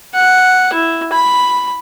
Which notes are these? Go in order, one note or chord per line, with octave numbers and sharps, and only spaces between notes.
F#5
E4
B5